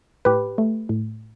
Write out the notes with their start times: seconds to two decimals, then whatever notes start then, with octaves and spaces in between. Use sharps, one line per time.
0.25 A2 G4 B4
0.58 A3
0.89 A2